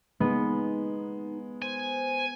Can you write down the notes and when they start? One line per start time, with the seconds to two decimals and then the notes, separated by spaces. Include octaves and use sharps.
0.20 G#3 B3 D#4
1.62 C5 G#5